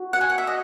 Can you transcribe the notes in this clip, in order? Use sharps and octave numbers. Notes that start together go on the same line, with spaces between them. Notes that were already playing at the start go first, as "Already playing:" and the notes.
Already playing: F#4
F#5
G#5
F#5
E5
D#5